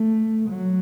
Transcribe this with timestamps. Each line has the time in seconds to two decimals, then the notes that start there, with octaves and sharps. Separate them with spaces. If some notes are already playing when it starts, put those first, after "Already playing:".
Already playing: A3
0.49 F#3